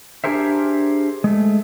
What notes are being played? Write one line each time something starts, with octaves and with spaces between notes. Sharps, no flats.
D4 G4 G#4 A#4 C5 E5
G#3 A3